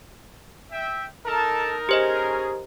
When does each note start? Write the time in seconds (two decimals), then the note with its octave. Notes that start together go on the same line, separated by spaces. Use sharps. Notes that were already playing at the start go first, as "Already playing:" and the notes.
0.72 E5 G5
1.25 D#4 A4 A#4 A5
1.89 C#4 G4 G#4 C5 D#5